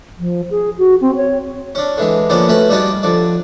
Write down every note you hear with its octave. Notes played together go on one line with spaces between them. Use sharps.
F3
G#4
F#4
C4
C#5
C#4 D4
D3 E3 G#3
D3 F3 A#3 B3 C#4 D4
A3 C#4 F#4 B4
G3 D4 D#4 F4 F#4 D5
D3 F3 D5